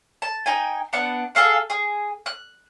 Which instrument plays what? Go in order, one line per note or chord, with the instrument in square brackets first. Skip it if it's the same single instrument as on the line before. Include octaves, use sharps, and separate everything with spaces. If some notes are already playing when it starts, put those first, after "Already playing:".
[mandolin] A5
D#4 G5 G#5
B3 D4 F#5
G#4 A4 F5 F#5
G#4
F#6